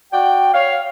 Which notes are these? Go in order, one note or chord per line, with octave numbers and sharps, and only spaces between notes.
F#4 D5 G5
C#5 F5